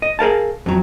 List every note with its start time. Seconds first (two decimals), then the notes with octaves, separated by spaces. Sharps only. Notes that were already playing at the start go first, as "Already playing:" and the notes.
0.02 D#5
0.19 G#4 A#4 F5 A5
0.66 F2 F#3